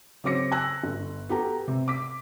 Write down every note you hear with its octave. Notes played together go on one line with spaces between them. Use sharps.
C#3 F#3 C4 D6 A#6 C#7
G#5 E6 F#6 A#6
G1
B3 F#4 G4 A4 A#5
C3
D6 B6